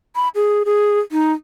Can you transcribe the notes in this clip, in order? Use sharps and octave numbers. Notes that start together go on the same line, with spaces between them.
B5
G#4
G#4
D#4